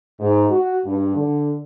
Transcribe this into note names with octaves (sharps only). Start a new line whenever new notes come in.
G#2
F#4
G2
D3